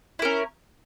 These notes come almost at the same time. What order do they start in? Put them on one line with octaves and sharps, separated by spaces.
E4 A#4 C#4